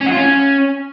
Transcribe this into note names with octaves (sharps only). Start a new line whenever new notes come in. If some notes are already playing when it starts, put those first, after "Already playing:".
C#4
F#4
F4
C#4